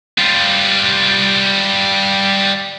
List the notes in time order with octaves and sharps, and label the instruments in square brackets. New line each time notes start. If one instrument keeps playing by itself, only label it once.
[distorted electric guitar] G3 F4